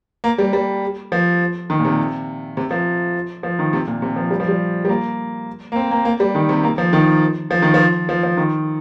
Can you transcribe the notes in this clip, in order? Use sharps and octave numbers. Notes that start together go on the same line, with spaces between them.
A#3
G3
G3
F3
D#3
A#2
C3
C3
F3
F3
D#3
C3
A#2
C3
F3
G3
F3
G3
G3
A#3
A#3
C4
A#3
A#3
G3
D#3
C3
A#3
F3
D#3
F3
D#3
F3
F3
F3
D#3